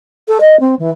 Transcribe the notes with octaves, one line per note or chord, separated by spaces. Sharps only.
A4
D#5
C4
E3